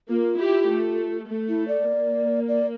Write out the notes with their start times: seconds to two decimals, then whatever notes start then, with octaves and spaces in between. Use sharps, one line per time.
0.08 A#3 F4
0.38 E4 G4
0.68 A3
1.28 A3
1.49 E4
1.68 D5
1.88 A#3
2.48 D5